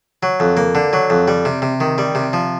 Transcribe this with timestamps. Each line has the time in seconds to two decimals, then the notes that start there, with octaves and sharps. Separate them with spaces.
0.23 F#3
0.40 F2
0.57 A#3
0.75 D3
0.93 F#3
1.10 F2
1.28 G3
1.45 C3
1.62 C3
1.80 D#3
1.98 G3
2.15 C3
2.33 F3